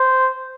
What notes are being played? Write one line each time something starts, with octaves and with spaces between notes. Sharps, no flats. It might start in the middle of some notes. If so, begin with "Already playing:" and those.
Already playing: C5